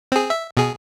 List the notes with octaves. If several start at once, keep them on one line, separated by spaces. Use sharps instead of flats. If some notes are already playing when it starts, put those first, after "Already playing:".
C4 G#4
E5
B2 G#4